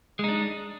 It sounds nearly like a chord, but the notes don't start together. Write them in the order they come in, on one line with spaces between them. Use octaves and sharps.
G#3 D#4 D4